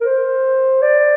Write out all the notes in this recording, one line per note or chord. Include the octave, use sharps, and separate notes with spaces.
A#4
C5
D5